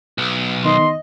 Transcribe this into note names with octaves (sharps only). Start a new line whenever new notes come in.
B1
D#3 B3 D#4 D#5 C6